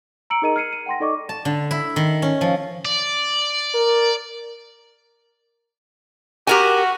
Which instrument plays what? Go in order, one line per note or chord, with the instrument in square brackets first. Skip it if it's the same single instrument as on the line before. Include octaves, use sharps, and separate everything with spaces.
[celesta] A#5 E6 C#7 D7 F#7
D#4 G#4 A#4 D#5 A#5 D#7
F6 G#6 C7 C#7 D#7
D#7
F#5 G5 C6 A#6
D#4 A4 D5 D#5 C#6 D6
[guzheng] A5
D3
E4
D#3
C#4
F3
[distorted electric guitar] D5
[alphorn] A#4
[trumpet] F#4 [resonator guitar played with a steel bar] G4 A#4 G#5